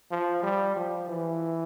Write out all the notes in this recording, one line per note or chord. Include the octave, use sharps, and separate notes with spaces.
F3
G3
F3
E3